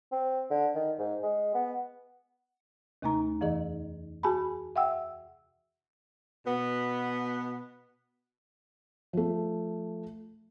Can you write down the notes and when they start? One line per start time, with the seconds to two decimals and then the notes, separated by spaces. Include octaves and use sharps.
0.12 C4
0.51 D3
0.75 D#3
0.99 G#2
1.23 G#3
1.55 B3
3.02 D#2 C3 A3 D#4 A#5
3.41 F2 E3 G#4 D#5
4.23 F#4 G#4 G#5 A5 B5
4.76 E5 F#5 G5 E6
6.47 B2 B3
9.13 F3 A3